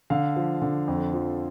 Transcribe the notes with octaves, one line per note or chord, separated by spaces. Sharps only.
D3 F5
F3
D3
F2
F3